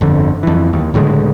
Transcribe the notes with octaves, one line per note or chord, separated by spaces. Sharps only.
G1 F2 D3
F2 E3
D#2
C#2 A2 D3 G#3